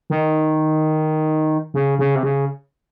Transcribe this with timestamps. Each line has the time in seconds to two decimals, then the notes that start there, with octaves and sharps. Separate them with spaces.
0.10 D#3
1.74 C#3
1.99 C#3
2.15 C3
2.23 C#3